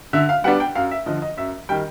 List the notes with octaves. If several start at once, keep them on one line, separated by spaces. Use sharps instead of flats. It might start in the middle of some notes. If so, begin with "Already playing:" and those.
D3 E5
F5
G3 B3 D4 F#5
G5
F#2 F5
E5
D3 F3 D#5
D#5
F#2 E5
D#3 G3 G5